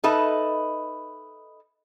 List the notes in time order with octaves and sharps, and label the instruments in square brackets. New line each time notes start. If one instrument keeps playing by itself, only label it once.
[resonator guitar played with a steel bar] D#4 A4 B4 D#5 E5